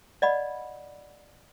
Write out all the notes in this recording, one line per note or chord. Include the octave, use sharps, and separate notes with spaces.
D5 D#5 F#5 B5